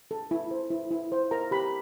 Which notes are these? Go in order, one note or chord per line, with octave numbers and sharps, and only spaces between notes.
A4
E4
C5
E4
E4
C5
A#4 A#5
G4 B5